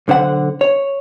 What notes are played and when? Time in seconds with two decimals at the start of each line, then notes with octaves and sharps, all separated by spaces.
0.08 B1 D3 C5 F#5
0.61 C#5